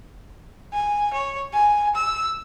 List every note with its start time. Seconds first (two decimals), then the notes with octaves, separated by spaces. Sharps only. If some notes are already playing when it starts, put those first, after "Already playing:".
0.73 G#5
1.13 C#5
1.53 G#5
1.95 E6